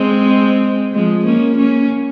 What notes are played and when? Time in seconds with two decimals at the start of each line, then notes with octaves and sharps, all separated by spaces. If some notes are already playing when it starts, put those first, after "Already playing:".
Already playing: G#3 C4
0.94 F3 G#3
1.25 A#3 C#4
1.58 A#3 C#4